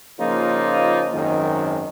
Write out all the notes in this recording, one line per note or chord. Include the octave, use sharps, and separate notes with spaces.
C#3 F3 A#3 D#4 F4
G#1 F#2 D#3